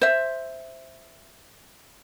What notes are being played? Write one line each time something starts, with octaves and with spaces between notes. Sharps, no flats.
C5 E5